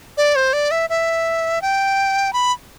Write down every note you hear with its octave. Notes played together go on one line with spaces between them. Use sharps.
D5
C5
D5
E5
E5
G5
B5